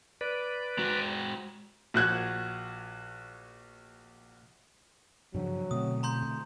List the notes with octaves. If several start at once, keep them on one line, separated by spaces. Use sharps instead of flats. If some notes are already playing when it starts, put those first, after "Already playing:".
B4 D5
G#3 F#4
A#1 F#4 F#6 G#6
G2 C#3 F3 F#3
B2 D3 A3 C4 D#6
A#5 C6 G6